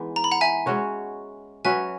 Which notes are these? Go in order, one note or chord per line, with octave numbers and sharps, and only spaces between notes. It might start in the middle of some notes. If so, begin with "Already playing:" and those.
Already playing: E3 G#3 B3 D#4
A#5
B5
F#5 A#5
E5 G#5
G#3 C#4 F#4 C#5
F#3 C#4 F#4 B4 E5 G#5